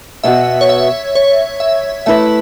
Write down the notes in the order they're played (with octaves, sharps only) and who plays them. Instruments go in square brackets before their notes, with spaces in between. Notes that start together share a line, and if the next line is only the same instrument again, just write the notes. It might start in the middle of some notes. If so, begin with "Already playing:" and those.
[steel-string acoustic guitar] B2 B3 F#4 [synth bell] E5
[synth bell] C#5
E5
C#5
E5
[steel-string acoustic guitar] A3 E4 B4 [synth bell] E5